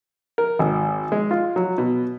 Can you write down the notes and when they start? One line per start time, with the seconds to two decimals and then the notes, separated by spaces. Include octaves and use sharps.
0.38 A#4
0.59 G#1
1.12 G#3
1.31 F4
1.56 F#3
1.78 B2